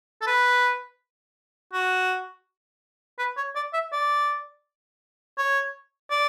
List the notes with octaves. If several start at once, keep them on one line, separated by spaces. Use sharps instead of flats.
A4
B4
F#4
B4
C#5
D5
E5
D5
C#5
D5